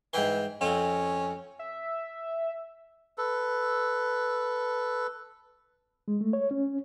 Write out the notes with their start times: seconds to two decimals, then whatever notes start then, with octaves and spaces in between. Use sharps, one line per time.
0.13 G#2 E3 G5 C6
0.61 F2 C4 C#4
1.59 E5
3.18 A4 B4
6.08 G#3
6.21 A3
6.33 C#5
6.51 C#4